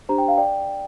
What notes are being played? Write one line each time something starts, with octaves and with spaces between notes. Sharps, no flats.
D4 G4 C5 A#5
G5
F5
D5 G5